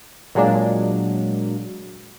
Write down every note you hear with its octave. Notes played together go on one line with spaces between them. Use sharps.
A#2 F#3 G#3 A#3 D4